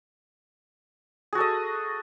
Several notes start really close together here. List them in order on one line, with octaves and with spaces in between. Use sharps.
G#4 F#4 A4 D#5